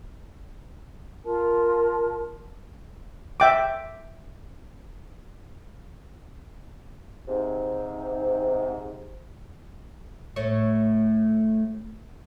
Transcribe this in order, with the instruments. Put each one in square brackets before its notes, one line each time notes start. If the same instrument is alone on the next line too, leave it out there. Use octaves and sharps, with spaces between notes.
[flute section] F4 A#4 A5
[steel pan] E5 G5 D6
[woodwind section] G#2 C3
[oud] A2 A3 C#5